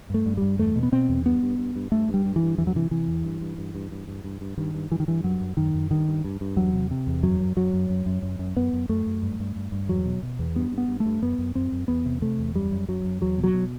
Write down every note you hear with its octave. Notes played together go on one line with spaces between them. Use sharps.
G2 A3
G2
G2 G3
E2 A3
B2
B3
B2 C4
E2
G2 B3
G2
G2
G2
G2 A3
G2
G3
G2
E3
G2
E2 E3
F#3
C3 E3
C3 E3
E2
G2
G2
G2
G2
G2
G2
G2
G2
G2 D#3
G2
G2 E3
D#3
G2 E3
F#2 F#3
F#2
F#2 D#3
F#2
G2 D#3
G2
G2
G2
E2 F#3
C3
C3
E2
F#2 F#3
F#2
F#2 F#3
F#2
F#2
F#2
F#2
F#2
F#2 B3
F#2
F#2 A3
F#2
G2
G2
G2
G2
E2 F#3
B2
B2
E2
G2 B3
G2
B3
G2
A3
G2
F#2 B3
F#2
F#2 C4
F#2
E2 B3
C3
C3 A3
E2
F#2 G3
F#2
F#2 F#3
F#2
E2 F#3
B2
F#3
B2